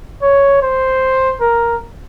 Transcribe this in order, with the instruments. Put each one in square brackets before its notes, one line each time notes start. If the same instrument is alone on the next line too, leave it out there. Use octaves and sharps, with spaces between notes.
[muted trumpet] C#5
C5
A#4